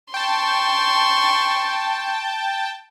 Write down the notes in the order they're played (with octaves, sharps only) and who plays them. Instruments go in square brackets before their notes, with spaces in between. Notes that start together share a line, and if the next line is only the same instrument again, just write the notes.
[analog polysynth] G5 A5 [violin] C6 C#6